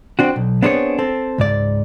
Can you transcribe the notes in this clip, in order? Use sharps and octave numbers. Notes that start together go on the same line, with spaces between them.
C4 D4 F#4
B1
B3 C4 D4 G#4 B4 C#5
C4 A4
C#2 G#2 D5